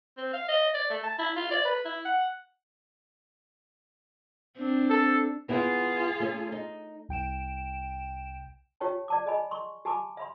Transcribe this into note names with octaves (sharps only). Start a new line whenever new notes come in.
C4
F5
D#5
D5
A3
A5
E4
F4
D5
B4
E4
F#5
C4 D4
A4
B3 E4 F4 G#4
A3 C#4
D#4
C2 G5 D7 E7
F4 G4 C#5 G5 A5
D5 A5 D6
G#4 D#5 G#5 B5
C6 C#6
G4 G#5 A5 B5 D6
E5 B5 C6